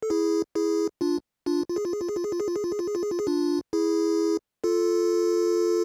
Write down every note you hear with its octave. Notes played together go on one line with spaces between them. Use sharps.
A4
E4 G#4
E4 G#4
D4 F4
D4 F4
F4
G#4
F4
G#4
F4
G#4
F4
G#4
F4
G#4
F4
G#4
F4
G#4
F4
G#4
F4
G#4
F4
G#4
D4 F4
E4 G#4
F4 A4